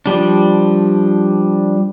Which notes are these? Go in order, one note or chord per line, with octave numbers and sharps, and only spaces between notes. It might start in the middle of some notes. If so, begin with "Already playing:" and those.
F3 G3 D4